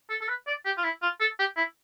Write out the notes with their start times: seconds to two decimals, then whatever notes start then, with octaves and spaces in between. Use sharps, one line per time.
0.10 A4
0.21 A4
0.28 B4
0.47 D5
0.65 G4
0.78 F4
0.84 E4
1.02 F4
1.20 A4
1.39 G4
1.57 E4